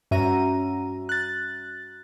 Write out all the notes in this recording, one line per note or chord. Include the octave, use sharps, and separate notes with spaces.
G2 C#4 F#4 E5 A#5 D#7
F#6 A6